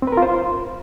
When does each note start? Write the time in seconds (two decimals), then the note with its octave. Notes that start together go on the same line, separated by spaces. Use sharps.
0.02 C4
0.07 B4
0.12 A#4
0.17 F4
0.22 C5